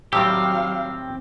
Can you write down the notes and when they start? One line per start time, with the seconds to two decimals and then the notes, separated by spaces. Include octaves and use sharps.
0.13 A2 D#3 F#3 G3 C4 G4 F5 E6